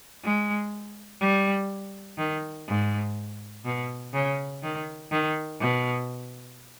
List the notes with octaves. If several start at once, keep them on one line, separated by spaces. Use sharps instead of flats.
G#3
G3
D#3
G#2
B2
C#3
D#3
D#3
B2